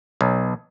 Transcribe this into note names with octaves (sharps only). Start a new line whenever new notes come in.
B1